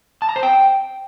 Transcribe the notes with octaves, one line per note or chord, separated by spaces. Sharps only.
A5
A#5
C5
G5